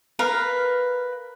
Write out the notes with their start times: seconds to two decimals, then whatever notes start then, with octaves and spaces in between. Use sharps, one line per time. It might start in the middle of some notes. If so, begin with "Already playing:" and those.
0.19 A#4 B4 F5